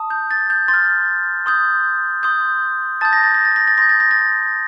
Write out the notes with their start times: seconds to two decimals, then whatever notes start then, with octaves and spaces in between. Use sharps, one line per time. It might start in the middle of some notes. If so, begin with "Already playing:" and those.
Already playing: A5 D#6
0.10 G6
0.31 A6
0.50 G6
0.68 C6 A6
0.74 F6
1.46 C6 D#6 G6
2.23 C6 D#6 G6
3.01 A5 D#6 G6 A6
3.13 A#6
3.23 A6
3.34 A#6
3.45 A6
3.56 A#6
3.67 A6
3.78 C6 D#6 G6 A#6
3.89 A6
4.00 A#6
4.11 A6